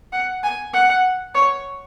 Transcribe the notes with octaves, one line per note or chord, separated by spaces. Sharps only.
F#5
G#5
F#5
C#5